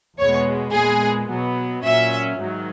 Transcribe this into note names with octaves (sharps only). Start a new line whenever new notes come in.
E2 B2 G#3 B3 C#5
A#2 G#3 B3 G#4
B2 F#3 B3
A#2 F#3 C#4 E5
G#2 D#3 F#3